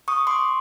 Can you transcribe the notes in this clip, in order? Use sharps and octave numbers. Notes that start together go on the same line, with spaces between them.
C#6 D#6
C6 D6